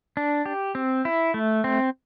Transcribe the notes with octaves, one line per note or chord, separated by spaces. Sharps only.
D4
G4
C4
E4
A3
C4